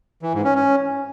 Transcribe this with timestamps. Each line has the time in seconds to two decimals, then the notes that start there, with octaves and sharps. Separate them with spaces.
0.22 E3
0.33 G#2
0.44 C#4
0.55 C#4